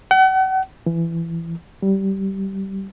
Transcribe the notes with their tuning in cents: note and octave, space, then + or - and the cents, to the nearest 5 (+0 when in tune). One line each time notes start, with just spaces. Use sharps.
F#5 +40
E3 +20
G3 -20